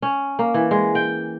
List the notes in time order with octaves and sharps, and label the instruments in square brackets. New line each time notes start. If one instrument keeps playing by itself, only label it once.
[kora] C#4
A#3
E3
G#3
G5